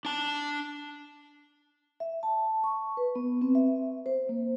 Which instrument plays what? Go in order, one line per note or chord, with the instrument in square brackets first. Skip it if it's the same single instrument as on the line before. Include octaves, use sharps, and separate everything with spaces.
[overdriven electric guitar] D4 A5
[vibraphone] E5
A5
C#6
B4
B3
C4
E5
C5
A#3